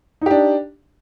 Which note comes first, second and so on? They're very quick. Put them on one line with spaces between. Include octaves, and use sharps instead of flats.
D#4 G4 D4